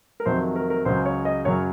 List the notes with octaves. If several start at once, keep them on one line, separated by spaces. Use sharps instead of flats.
A#4
F2 C3 D#3 F#3 C5
A#4
A#4
C#2 C#3 F#3 C5
C#5
D#5
F#2 C#3 F#3 C#5